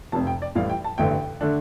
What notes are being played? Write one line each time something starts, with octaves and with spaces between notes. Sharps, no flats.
F1 F2 C3 A5
G5
D5
A1 A2 G3 F5
G5
A5
A1 G2 D3 A3 G5
D3 A3 D4